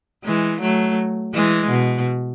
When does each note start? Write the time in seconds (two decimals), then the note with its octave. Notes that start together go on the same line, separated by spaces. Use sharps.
0.25 E3 G#3
0.61 F#3 A3
1.34 E3 G#3
1.70 B2